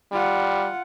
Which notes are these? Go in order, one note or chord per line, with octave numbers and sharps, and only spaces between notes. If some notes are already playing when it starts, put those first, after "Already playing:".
G3 F4 F#5